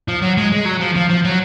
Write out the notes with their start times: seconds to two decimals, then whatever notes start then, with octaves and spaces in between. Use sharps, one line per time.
0.08 F3
0.22 F#3
0.37 G#3
0.52 G#3
0.65 F#3
0.80 F3
0.96 F3
1.09 F3
1.24 F#3